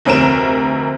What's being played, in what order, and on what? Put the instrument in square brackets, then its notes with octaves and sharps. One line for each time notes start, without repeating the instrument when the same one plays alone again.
[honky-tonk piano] F1 D2 C4 A#4 E7